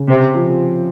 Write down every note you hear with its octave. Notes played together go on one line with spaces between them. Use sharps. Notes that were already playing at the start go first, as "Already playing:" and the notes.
Already playing: C#3
C3 C4
F3